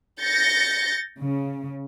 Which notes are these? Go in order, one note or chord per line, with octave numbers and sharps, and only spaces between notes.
G6 A6 A#6 C#7
C#3